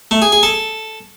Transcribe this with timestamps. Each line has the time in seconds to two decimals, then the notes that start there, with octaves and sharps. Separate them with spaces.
0.11 A3
0.22 G#4
0.32 G#4
0.43 A4